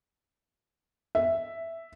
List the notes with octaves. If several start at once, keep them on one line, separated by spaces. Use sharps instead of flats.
E5